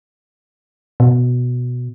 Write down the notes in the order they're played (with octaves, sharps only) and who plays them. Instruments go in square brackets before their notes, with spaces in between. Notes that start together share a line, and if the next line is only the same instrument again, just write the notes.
[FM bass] B2